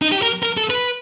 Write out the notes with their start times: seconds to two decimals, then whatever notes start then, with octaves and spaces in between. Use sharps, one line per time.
0.02 D#4
0.12 G4
0.22 A#4
0.43 A#4
0.57 A4
0.70 B4